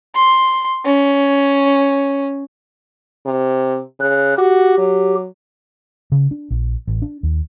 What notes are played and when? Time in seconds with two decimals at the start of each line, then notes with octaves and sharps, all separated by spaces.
0.15 C6
0.86 C#4
3.26 C3
4.00 C#3 F#6
4.38 F#4 G4
4.78 F#3
6.12 C#3
6.31 D4
6.50 A#1
6.88 A1
7.02 D4
7.23 D#2